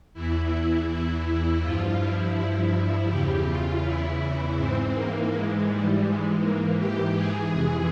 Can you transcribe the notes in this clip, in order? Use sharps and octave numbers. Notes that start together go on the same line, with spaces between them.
E2 E3 E4
E4
E4
G2 F3 F4
E4
E2 C#3 E3 G4
F4
E4
G#2 E3 C4
A#3
G#3
G3
G#2 E3 G#3
A#3
G4
G#4
F2 C3 E3